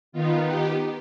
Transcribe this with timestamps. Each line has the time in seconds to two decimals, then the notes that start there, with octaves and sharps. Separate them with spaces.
0.12 D#3 B3 D#4 F4
0.45 G4